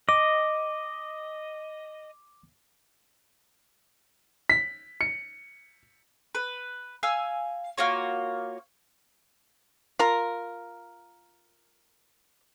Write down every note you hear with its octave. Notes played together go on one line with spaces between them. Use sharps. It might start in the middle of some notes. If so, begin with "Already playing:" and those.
D#5 D6
B6
C#7
B4
F5 G#5 E6
A#3 F4 F#4 C#5
F4 A#4